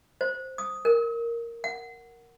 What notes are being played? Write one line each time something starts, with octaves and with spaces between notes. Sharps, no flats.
C5
D#6
A#4
F#5